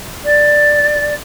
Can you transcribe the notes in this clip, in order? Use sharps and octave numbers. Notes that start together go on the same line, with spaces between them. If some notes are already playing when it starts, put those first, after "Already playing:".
D5